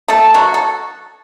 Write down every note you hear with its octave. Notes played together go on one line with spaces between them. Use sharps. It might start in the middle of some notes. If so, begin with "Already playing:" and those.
A3 A4
F#3 F#4
A4